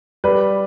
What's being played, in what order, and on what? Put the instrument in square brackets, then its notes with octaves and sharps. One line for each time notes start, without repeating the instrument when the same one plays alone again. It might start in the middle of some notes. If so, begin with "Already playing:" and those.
[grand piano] G3 [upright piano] B4